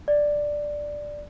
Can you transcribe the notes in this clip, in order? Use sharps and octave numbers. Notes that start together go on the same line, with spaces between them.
D5